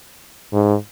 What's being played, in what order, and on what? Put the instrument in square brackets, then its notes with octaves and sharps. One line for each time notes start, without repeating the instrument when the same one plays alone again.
[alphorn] G#2